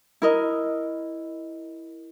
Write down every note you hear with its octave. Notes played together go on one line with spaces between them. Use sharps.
E4 A#4 D#5